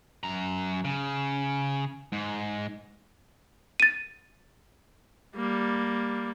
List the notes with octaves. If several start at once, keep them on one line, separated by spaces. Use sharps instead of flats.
F#2 A#5
C#3
G#2
A6 D#7
G3 A#3